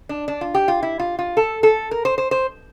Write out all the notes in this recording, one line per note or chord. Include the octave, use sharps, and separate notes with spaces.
D4
D4
F4
G4
F4
E4
F4
F4
A4
A4
A#4
C5
C5
C5